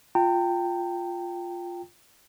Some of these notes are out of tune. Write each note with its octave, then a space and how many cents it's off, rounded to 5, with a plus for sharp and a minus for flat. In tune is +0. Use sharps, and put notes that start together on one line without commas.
F4 +0 G5 +0 A#5 -45